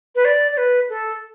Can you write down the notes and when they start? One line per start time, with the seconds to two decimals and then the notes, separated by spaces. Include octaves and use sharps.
0.15 B4
0.25 D5
0.52 D5
0.57 B4
0.90 A4